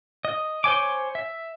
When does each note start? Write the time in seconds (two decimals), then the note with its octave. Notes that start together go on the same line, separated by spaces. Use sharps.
0.25 D#5
0.64 C5 C#5 G#5 D6
1.15 E5